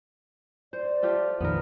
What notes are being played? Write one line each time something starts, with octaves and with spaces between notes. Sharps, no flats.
C5 D5
A3 F4 G4
F2 A#2 D#3 B3 A#4